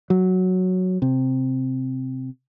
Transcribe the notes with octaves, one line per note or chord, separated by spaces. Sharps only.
F#3
C3